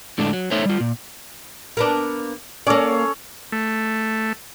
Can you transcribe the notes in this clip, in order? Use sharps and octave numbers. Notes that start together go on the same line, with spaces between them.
A2 D3 G#3 A3 D4
F#3
A3 D#4 A4 C5 C#5 E5
G3 F4
A#2
A#3 B3 D4
A#3 C#4 A4 D5
A3